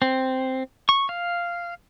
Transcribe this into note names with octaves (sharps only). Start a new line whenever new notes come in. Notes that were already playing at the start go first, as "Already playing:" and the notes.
C4
C#6
F5